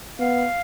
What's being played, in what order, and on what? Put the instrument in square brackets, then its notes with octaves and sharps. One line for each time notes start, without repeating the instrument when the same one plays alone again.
[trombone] B3 [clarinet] F5